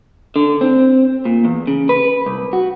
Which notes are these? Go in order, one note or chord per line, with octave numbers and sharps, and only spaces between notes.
D3
C4
A#2
E2
C#3
B4
C2
F#4